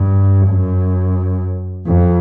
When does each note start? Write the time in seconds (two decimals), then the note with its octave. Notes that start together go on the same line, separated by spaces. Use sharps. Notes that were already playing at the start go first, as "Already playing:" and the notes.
Already playing: G2
0.48 F#2
1.87 F2